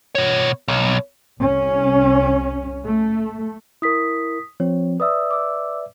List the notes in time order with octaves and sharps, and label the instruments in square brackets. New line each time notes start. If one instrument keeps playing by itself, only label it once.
[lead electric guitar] B2 C#5
B1
[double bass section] C2 C#4
A3
[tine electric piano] E4 A#4 [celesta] D#6 B6
[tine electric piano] F3 C4 [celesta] C#5
[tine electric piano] B4 D5 E5 [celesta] D#6 E6
[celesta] D6 E6